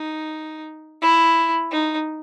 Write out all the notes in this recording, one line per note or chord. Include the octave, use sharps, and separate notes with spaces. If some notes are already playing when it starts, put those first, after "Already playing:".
Already playing: D#4
E4
D#4